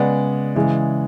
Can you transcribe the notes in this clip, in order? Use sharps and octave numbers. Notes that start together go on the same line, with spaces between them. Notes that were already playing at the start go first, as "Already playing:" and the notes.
Already playing: C#3 G#3 B3 D5 F#5
C#3 E3 G#3